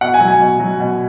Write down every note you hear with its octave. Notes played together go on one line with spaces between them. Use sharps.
B2 F#5
G#5
F#3
G#5
B2
F#3
B2